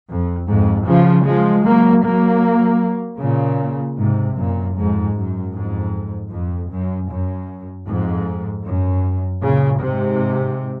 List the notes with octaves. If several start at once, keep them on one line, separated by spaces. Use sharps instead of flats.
F2
F2 G#2
C#3 F3
F3 G#3
F#3 A#3
F#3 A#3
A#2 C#3
G#2 C3
F#2 A#2
F2 G#2
F#2
F2 G#2
F2
F#2
F#2
F2 G#2
F#2
A#2 C#3
G#2 C3